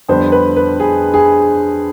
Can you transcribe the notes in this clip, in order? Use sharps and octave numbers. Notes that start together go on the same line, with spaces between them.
F2 D3 G3 B3 C5
B4
B4
G#4
G#4